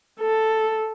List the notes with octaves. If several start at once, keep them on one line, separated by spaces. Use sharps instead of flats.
A4